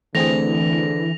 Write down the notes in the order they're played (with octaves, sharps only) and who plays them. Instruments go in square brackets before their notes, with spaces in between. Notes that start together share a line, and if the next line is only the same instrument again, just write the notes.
[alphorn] D3 [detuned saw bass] E3 [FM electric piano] A3 C4 G#4 [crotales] A#6 F7